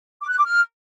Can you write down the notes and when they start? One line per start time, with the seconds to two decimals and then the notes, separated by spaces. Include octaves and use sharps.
0.21 D6
0.29 F#6
0.38 D6
0.46 F6